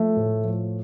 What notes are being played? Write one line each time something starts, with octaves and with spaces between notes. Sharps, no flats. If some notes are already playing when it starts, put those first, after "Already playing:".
Already playing: F3 A3
A2
F3